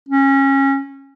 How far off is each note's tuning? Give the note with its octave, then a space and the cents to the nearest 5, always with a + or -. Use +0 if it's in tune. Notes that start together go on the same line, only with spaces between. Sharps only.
C#4 -20